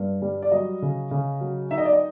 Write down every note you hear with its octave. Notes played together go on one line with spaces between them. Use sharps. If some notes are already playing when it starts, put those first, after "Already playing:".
Already playing: G2
G3
D5
F#3 D#5
C#3
C#3
F#3
D#4 E5
D#5
D5
D#5